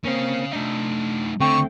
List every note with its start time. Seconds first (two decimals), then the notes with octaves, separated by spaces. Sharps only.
0.05 A#3 C4 C#4 F5
0.53 A3 D4 D#4
1.40 D3 A3 C4 G5 C#6